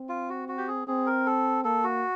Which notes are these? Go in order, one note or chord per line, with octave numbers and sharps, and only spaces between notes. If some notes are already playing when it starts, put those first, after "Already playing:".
Already playing: C4
F4
F#4
F#4
G4
G#4
C4 G#4
A#4
A4
A#3 A4
F#4